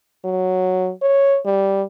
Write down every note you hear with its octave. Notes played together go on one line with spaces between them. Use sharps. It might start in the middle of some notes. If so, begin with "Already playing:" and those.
F#3
C#5
G3